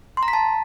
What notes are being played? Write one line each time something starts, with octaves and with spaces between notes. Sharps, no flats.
C6
A#5
B6
A5